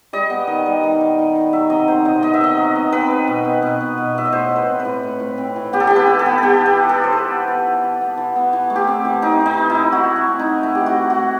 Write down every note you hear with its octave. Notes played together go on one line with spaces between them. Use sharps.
G3 D#5
B3
D#3
G3
D#3
D#3
D#3
D#3
F#3 E5
C3 D#5
D#3 C5
C3 D#5
B3 D#5
E5
D#3 D#5
F#3
B3
C4 B4
C4
B2
C4
B2
B2
B2
B2 E5
D#5
A2 C5
E3
B4
C4
B4
A2
A2
A2
C4
E3
B3 G4
A4
E3 G4
B4
E3
A4
B3
B3 G4 A4
E3 B4
E3
A4
E3
C5
E3 B4
B3
E3
E3
E3
B3
E3
B3
E3
A3
G4
C4
E3
C4 D#4
E3 D#4
E3
E3 E4
C4 F#4
A3
E4
C4
D#4
E3
A3 E4
G4
E3
F#4
E3
F#4
A3